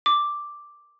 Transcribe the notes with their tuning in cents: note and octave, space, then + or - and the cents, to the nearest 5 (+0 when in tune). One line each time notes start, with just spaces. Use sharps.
D6 +0